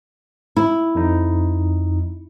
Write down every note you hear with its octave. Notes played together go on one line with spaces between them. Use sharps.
E4
F2 D#4